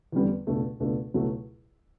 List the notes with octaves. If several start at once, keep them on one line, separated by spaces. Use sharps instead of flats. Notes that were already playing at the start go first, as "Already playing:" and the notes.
E2 D3 G3 B3
C#2 B2 A3 D4
C#2 B2 A3 D4
C#2 B2 F#3 A3 E4